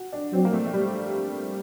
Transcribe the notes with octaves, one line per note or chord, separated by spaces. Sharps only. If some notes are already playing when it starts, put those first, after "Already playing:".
Already playing: F#4
D4
F#3 C4
A#3
A3
A3
G3